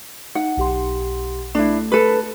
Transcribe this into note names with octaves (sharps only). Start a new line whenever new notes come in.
D#4 F#5
B1 G4 C6
A3 D4 E4
A4 B4